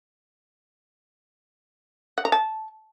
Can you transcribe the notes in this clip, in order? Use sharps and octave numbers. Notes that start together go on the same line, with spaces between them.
F#5
A#5
A5